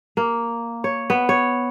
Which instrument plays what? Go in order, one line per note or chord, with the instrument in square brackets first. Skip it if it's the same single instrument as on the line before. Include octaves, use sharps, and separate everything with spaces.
[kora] A#3
C#5
B3
C#5